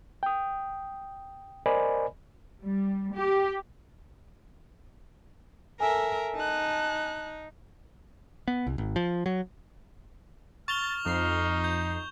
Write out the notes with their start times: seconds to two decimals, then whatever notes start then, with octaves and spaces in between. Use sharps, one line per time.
0.23 G5 D#6
1.66 A#4 C5 D5 D#5 G#5 B5
2.64 G3
3.14 G4
5.80 A4 A#4 E5 G#5
6.36 D#4 A5 F#6
8.48 B3
8.67 C2
8.78 G#1
8.96 F3
9.26 F#3
10.68 C#6 F6 A6 F7 G7
11.06 F2 D#4 C7
11.64 G6